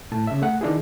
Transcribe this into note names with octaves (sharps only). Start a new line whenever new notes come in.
A2 A5
C#3 E5
A3 F#5
D#3 D4 E4 G#4